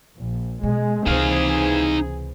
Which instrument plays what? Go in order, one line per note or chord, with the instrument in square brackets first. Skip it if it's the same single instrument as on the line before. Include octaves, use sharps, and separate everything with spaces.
[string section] A#1
[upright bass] B2 [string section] G#3
[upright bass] C#2 C3 [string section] E3 C4 G#4 [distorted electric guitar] D#4 F5